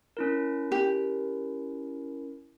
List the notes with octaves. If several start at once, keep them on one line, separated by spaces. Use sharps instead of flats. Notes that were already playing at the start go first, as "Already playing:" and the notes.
C#4 E4 A#4
G4